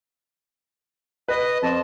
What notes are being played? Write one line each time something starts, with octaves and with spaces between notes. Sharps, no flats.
B4 D#5
F2 A5